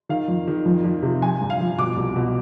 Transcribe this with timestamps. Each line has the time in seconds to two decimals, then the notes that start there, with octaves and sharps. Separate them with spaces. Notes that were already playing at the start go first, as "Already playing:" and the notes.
0.09 D#3 F5
0.28 F2
0.47 D#3
0.66 F2
0.84 F2
1.02 C3
1.22 F3 G#5
1.41 G2
1.50 F5
1.60 F3
1.78 B2 D6
1.96 C2
2.16 B2